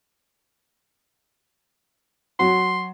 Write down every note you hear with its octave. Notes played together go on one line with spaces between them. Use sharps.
F#3 F#4 C6